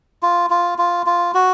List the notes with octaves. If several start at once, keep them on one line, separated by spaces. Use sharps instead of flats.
F4
F4
F4
F4
F#4